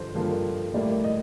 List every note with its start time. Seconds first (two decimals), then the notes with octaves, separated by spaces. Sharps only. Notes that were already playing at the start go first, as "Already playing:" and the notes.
Already playing: G2 D3 F3 C5
0.15 G2 D3 F3 A#3
0.74 A2 G3 A#3 D5
1.04 D#5